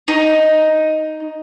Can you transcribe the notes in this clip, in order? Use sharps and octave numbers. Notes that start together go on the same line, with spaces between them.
D#4